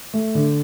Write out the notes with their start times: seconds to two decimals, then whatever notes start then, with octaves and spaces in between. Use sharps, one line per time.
0.14 A3
0.35 D3